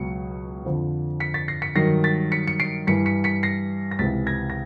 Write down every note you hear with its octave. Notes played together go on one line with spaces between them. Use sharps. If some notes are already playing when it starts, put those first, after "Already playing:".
Already playing: C#2 B2 F#3 C#7
F2 D3 F3
B6 C#7
A6 B6
A#6 C7
B6 C#7
G2 D#3 F#3 A#6 C7
A6 B6
B6 C#7
C#7
C7 D7
G2 E3 B6 C#7
B6 C#7
B6 C#7
A#6 C7
A#6
C#2 C3 E3 A6 B6
G#6 A#6
A#6